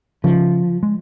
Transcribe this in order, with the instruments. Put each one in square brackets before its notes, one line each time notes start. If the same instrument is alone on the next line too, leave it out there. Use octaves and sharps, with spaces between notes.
[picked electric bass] C#3 [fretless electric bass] F3
[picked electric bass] G#3